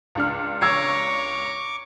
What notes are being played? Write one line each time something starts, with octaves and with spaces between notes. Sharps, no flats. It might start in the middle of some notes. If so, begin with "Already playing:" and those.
C#2 D4 F6
C#5 A#5 C#6 D6 E6 G#6 C7